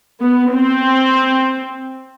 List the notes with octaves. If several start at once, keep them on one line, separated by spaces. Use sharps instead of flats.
B3
C4